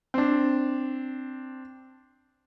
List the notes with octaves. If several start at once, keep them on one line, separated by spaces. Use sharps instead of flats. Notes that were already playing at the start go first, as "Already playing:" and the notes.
C4 D4